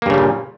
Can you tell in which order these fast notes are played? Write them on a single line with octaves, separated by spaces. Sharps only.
A#3 G2 C#3 G3 A#2